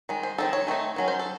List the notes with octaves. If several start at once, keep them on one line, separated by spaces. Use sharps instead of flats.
D#3 G#3
C5
D#3 A3 C4 D#4 A4
C#5
D#3 A3 C4 D#4
D#3 F#3 C#4
C5
A4